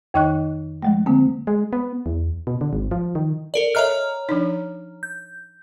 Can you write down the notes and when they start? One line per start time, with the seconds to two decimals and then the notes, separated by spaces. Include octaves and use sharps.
0.14 F2 D#3 D#4 D#5 C#6 F#6
0.83 F3 G#3 A3
1.06 D3 A#3 C4
1.47 G#3
1.73 B3
2.06 E2
2.47 B2
2.61 D3
2.73 G#1
2.91 F3
3.15 D#3
3.54 A4 A#4 D5
3.75 A4 C#5 D#5 E5 A#5 F6
4.29 F3 D4 D#4
5.03 G6